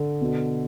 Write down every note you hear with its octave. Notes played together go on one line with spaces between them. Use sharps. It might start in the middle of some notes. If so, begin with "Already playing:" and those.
Already playing: D3
B2